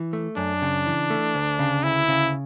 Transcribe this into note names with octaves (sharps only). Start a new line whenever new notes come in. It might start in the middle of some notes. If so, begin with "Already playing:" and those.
Already playing: E3
A3
F#2 D4
C#3
E3
A3
D2
C#3
D2 E4
C#3